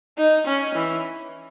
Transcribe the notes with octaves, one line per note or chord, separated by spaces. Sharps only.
D#4
C#4
E3